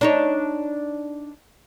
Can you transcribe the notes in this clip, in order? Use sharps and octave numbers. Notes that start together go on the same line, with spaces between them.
D4 D#4 C#5